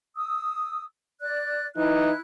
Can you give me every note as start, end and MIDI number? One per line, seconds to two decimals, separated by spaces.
0.16 0.83 87
0.16 0.83 88
1.21 1.66 74
1.21 1.66 90
1.77 2.12 52
1.77 2.12 63
1.77 2.19 64
1.77 2.19 90